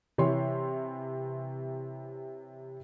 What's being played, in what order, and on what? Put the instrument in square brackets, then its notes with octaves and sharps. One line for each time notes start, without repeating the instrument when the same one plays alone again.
[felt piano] C3 E3 C#5 C6